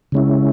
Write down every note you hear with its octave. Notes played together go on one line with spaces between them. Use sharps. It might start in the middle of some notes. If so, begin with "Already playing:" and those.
C#3 G#3 C#4 E4